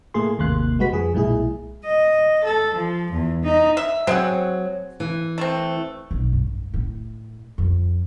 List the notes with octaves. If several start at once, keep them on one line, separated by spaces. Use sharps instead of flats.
A2 A3 A#3 G#4 C6
G#1 D#2 C3 A#3 C6 F#6
G3 G#3 F#4 B4 B6
F2 F3 G#4
B1 A#2 G#3 E4 G#4
D#5
A4
F3
E2
D#4
E5
F#3 C4 F#4 G#4 F#5
E3
A3 C4
B1
G2
A2
F2